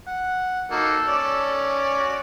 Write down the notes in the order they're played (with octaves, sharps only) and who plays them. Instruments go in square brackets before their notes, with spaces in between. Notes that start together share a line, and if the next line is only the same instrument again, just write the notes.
[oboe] F#5
[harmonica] A#3 D#4 F#4 [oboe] A4
[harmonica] C#4 D5
[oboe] F#4